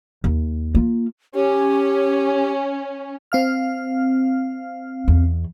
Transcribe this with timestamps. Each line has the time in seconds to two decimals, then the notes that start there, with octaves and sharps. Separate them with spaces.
0.24 D#2
0.75 A#3 F4
1.35 C#4 G4
3.32 C4 F5 F6
5.08 E2